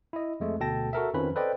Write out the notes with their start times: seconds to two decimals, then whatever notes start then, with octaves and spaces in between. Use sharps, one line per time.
0.13 E4 D#5
0.40 F2 G#3 A3
0.60 D2 B2 A4 G5 A5 A#6
0.93 F#4 A4 A#4 E5
1.14 F2 D#3 F3 C#4 B4 B5
1.36 A4 B4 C5 D5 D#5 G5